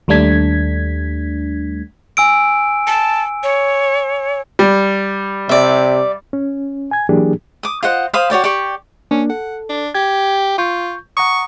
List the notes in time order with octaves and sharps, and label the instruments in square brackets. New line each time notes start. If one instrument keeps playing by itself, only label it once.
[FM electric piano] D#2 G3 A3 D4 G#6 B6
[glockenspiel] G#5 E6 D7
[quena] A5
C#5
[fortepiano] G3
[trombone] C3 [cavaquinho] D5 E5
[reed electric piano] C#4
G#5 G#6
E3 F#3 A#3 D4 G4 G#4
[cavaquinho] D6 D#6
F4 C5 D#5 F#5
C5 F5 B5 D#6
F#4 C#5 D5 G5
G4 D5 C#6
[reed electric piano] A#3 D4 [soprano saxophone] C#4
[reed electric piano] A4 [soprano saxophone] F#5
[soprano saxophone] D4
[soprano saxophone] G4 [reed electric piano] G#6
[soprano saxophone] F4 [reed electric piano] C#6 G6
[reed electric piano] F#5 A#5 D#6 [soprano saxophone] C#6